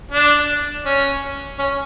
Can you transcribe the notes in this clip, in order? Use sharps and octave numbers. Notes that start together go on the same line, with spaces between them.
D4
C#4
C#4